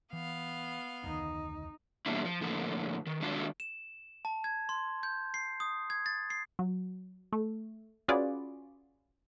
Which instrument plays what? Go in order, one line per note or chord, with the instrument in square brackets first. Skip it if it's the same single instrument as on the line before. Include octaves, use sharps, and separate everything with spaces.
[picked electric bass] E3 [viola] B3 F5
[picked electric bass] F1 D2 D#3 [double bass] D#4
[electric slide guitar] B2 E3 G3 A#3 D4 E4
F3
A2 D3 F3 A#3
D#3
D#3 G#3 D4 F4 F#4
[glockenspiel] E7
A5
G#6
C6
G6
C7
D#6
G#6
A6
C7
[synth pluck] F#3
A3
C#4 F4 F#4 G#4 B4 D5